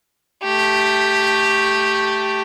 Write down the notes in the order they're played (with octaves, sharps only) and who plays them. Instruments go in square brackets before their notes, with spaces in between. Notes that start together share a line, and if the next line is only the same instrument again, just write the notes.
[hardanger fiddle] A3 G4